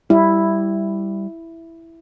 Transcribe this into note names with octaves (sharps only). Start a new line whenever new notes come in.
G3 E4